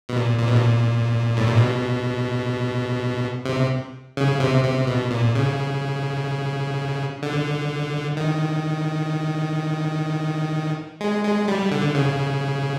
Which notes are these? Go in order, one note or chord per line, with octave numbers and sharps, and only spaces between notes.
B2
A#2
A#2
B2
A#2
A2
A#2
B2
C3
C#3
C3
C3
B2
A#2
C#3
D3
D#3
G#3
G#3
G3
D3
C#3